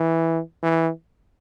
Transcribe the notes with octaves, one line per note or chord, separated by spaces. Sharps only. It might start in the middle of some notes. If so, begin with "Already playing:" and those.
Already playing: E3
E3